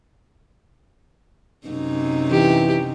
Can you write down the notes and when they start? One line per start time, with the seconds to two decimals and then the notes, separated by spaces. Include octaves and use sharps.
1.67 F#2 C3 D#4
2.31 E3 G4